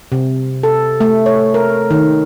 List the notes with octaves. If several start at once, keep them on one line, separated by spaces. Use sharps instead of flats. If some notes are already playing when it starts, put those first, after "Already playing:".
C3
A4
A3
C#5
A#4
D#3